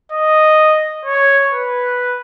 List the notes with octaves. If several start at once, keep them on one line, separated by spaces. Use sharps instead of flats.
D#5
C#5
B4